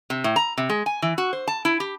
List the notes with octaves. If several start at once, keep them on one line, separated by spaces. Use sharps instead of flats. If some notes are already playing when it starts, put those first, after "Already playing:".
C3
A2
A#5
C3
G#3
G#5
E3
F#4
C5
A5
E4
G4